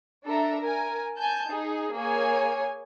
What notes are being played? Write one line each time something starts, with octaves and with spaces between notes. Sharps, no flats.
D4 A4 E5 A#5
A#4 G#5
G#5 A5 G6
D#4 G#4
A#3 G#4 C#5 G#5